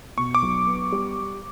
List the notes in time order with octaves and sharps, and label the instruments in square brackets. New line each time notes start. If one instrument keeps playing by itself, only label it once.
[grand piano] B2 [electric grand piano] C#6
[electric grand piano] D6
[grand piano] B1
B3
G3